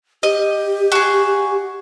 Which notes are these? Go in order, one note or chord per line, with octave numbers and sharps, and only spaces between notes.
G4 D#5
F#4 G#4